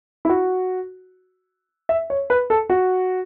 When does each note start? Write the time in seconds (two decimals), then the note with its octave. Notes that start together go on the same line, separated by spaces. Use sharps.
0.25 E4
0.29 F#4
1.89 E5
2.10 C#5
2.30 B4
2.50 A4
2.70 F#4